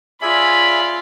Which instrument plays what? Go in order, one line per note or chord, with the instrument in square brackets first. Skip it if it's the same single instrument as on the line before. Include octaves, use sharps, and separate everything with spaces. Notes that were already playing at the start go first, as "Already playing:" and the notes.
[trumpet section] C#4 D5 B5 [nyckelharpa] F4 [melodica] G#4 E5 G#5